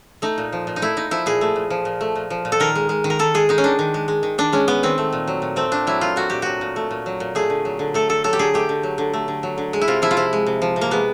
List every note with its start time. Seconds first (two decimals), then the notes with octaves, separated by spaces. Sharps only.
0.22 A3 D#4
0.38 A#2
0.52 F3
0.67 A#2
0.76 D#4
0.82 A3 E4
0.97 A#2 D#4
1.11 F3 E4
1.26 A#2 G#4
1.41 A3
1.56 A#2
1.70 F3
1.85 A#2
2.01 A3
2.16 A#2
2.30 F3
2.45 A#2
2.52 A4
2.60 D#3 A#4
2.75 G#3
2.89 G#3
3.04 D#3
3.10 A#4
3.19 D#3 A4
3.34 G#3 G#4
3.49 G#3 D#4
3.58 C#4
3.64 D#3 D4
3.79 D#3
3.94 G#3
4.08 G#3
4.23 D#3
4.38 D#3 D4
4.53 G#3 C#4
4.67 G#3 B3
4.83 D#3 C4
4.98 A3
5.13 A#2
5.28 F#3
5.42 A#2
5.56 A3 C4
5.72 A#2 D4
5.87 F#3 E4
6.01 A#2 F4
6.16 A3 F#4
6.30 A#2 G4
6.42 F#3 F#4
6.61 A#2
6.76 A3
6.91 A#2
7.06 F#3
7.20 A#2
7.35 A3 G#4
7.50 D3
7.65 F#3
7.79 D3
7.94 A3 A4
8.09 D3 A4
8.24 F#3 A4
8.33 G4
8.39 D3 G#4
8.54 A3 G4
8.69 D3
8.83 F#3
8.98 D3
9.13 A3
9.28 D3
9.43 F#3
9.58 D3
9.73 G#3
9.81 E4
9.88 C3 F4
10.02 F3 E4
10.11 F4
10.17 C3 E4
10.33 G#3
10.46 C3
10.62 F3
10.76 C3
10.81 A#3
10.91 G#3 B3